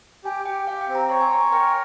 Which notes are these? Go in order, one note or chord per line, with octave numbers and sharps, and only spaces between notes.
G4 G#5
G4 G5
G4 F5
G5
C4
A#5
C#5 C6
G#5
C#5 A#5
G#5
A#4 G5